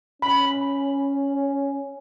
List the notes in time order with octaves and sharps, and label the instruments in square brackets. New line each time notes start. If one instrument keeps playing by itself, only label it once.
[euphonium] C#4 [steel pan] B5